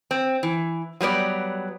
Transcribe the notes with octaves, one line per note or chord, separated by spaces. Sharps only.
C4
E3
F#3 G3 B3 D5